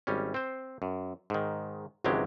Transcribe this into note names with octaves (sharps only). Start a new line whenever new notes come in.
G#1 G3 C#4
C4 C5
F#2
G#2 D#3
G#1 C#2 E3 F#3 G#3 G4